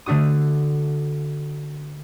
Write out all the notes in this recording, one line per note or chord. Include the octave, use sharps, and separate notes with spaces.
D3 A3 D4 F#4 D#6